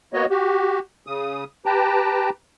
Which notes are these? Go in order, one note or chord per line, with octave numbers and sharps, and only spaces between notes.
A#3 B3 F#4 C#5 D#5
F#4 G4
C#3 D#6
G4 B4 G5 A5 A#5